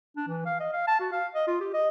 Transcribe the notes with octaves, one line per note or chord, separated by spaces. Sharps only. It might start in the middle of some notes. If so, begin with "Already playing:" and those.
D4
E3
F5
D#5
F5
A5
F#4
F5
D#5
F4
G4
D#5